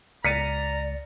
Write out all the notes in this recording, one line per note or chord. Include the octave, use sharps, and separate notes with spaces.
C#2 D5 A#5 A6 B6 C#7 D#7